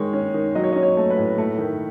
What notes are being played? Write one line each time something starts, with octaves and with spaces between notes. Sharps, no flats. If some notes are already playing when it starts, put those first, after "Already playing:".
Already playing: D#3 G#3 C#5
C#4
D#3
F#3 D#5
C#5
C#4 D#5
C#5
A3
B4
A2
A3
D#3